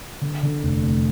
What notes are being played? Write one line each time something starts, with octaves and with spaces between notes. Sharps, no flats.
D3
D3
F1
F1